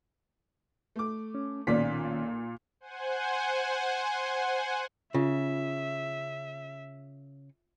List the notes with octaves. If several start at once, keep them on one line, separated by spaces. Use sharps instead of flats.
A3 D6
C#4
B1 A#2 D#3 C#4 D5 B6
C5 F#5 G#5
C#3 F4 E5